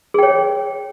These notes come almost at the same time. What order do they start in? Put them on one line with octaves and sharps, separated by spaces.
G#4 G5 C#5